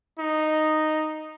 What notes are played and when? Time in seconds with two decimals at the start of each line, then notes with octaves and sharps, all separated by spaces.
0.19 D#4